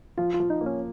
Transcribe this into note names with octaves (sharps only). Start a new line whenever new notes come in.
F3 F4
F4
F3
D#4
A#3
C#4